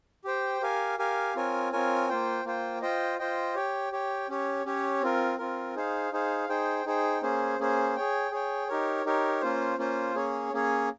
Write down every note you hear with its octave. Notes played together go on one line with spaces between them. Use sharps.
G4 C5 G5
G4 A#4 F5 G#5
G4 A#4 F5 G#5
C4 F4 A#4 C#5 G#5
C4 F4 A#4 C#5 G#5
A#3 F4 C5 G5
A#3 F4 C5 G5
F4 C5 D#5 G5
F4 C5 D#5 G5
G4 C#5 G5
G4 C#5 G5
C#4 G4 C#5
C#4 G4 C#5
C4 F4 A#4
C4 F4 A#4
D#4 G#4 C5 F5
D#4 G#4 C5 F5
D#4 G#4 C5 G5
D#4 G#4 C5 G5
A#3 C#4 G#4 C5
A#3 C#4 G#4 C5
G#4 C#5 G5
G#4 C#5 G5
D#4 G4 A#4 C#5
D#4 G4 A#4 C#5
A#3 C#4 F4 C5
A#3 C#4 F4 C5
A#3 C#4 G#4 C#5
A#3 C#4 G#4 C#5